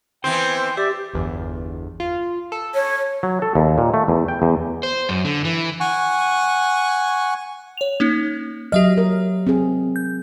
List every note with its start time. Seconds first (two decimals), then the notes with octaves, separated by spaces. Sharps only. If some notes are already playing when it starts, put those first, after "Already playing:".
0.24 E3 B3 C4 C5 G5
0.77 G4 D5 E5
1.14 G1 E2
2.00 F4
2.52 A4
2.75 C#5
3.23 F#3
3.42 A4
3.55 D#2
3.78 A#2
3.94 A3
4.08 E2
4.28 G5
4.42 E2
4.83 C5
5.09 F#2
5.25 D3
5.45 E3
5.80 F#5 G#5 C#6
7.77 C#5 F7
8.00 A#3 C#4 D#4
8.72 F#3 G4 D#5 E5 F6
8.97 A#4
9.47 C4 G#4
9.96 G6